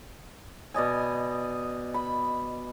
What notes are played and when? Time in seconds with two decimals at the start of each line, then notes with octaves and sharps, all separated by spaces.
0.74 B2 D5 D#5 G#5
1.94 B5